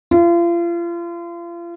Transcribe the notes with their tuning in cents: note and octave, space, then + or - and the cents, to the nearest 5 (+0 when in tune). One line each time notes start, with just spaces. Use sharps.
F4 -35